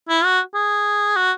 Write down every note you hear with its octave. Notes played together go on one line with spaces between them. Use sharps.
E4
F#4
G#4
F#4